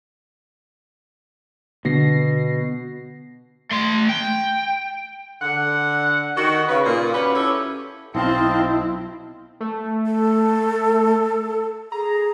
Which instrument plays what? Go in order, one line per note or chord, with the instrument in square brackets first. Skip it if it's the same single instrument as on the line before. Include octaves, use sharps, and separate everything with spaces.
[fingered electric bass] B2 [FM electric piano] D3 A#6 C7
[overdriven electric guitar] A3 C6
G5
[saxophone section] D3 F#5
D#3 F#4
C#3 B4
A#2
C#4 F#4 G4 B4
C#4 E4 G4 A4
[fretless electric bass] B1 [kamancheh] C4 [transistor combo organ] E4 [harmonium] D#5 F5 A5
[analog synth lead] A3
[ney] A4
[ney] G#4 [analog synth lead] A#5